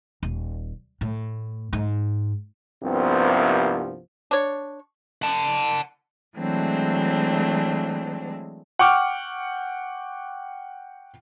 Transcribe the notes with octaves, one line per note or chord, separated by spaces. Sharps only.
D#1
A2
G#2
C2 G2 C3 F3 A#3 B3
D4 C#5
F#5 A5
E3 F#3 G#3 A3 C4 D4
F#5 G5 C#6 D6 F6